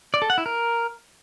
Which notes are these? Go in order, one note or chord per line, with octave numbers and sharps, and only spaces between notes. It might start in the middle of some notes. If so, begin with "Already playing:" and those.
D5
A4
F#5
E4
A#4